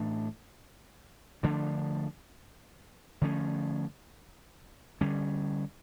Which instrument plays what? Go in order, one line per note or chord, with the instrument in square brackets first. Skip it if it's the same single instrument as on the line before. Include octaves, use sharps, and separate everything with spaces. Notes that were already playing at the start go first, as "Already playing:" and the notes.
Already playing: [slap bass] A2 E3 A3 D4
D3 F3 A3 D4
D3 F3 A3 C#4
D3 G3 C#4